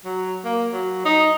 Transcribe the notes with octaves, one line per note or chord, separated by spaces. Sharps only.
F#3
A#3
F#3
D#4